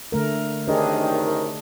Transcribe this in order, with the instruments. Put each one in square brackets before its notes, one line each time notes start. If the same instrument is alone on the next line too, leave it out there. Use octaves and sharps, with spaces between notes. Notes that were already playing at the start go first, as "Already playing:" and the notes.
[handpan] D3 A3 A#4
[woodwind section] F#2 C3 D#3 [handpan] D4 G#4